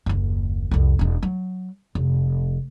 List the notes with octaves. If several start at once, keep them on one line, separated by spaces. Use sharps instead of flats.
F#1 D#2
C2 F2
E1 D#4
F#3
F1